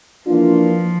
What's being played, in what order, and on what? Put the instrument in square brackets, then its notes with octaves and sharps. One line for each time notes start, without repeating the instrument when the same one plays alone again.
[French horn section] E3 A#3 D4 F4 [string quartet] F3